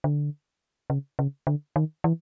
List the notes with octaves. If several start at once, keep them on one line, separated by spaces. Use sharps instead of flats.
D3
C#3
C#3
D3
D#3
E3